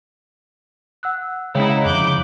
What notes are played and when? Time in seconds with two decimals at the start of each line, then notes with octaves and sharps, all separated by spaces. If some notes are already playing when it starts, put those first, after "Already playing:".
1.03 F#5 E6 F#6
1.55 C#3 G#3 C#4 D#4 E4 C#5 G5
1.85 F2 D3 F3 E4 D6 F#6 G6